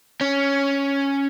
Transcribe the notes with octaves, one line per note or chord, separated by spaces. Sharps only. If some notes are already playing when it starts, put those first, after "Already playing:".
C#4